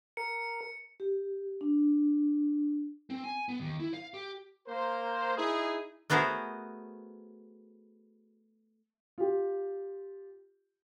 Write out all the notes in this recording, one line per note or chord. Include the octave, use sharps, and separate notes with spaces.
A#4 C#7
G4
D4
C4
G#5
B3
D#2
E4
F5
G4
A#3 A#4 C5
D#4 E4 G#4
A3 B3 F#4 G#4 A#4 C5
F4 G4